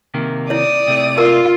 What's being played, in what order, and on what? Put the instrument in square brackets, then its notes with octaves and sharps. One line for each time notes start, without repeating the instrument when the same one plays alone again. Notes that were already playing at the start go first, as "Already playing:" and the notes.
[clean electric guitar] C3 D#3 A#3
[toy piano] E4 C#5 [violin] D5 D#6
[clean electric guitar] C3 A3
[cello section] F4 [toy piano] A#4